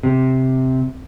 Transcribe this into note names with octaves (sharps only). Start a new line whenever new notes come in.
C3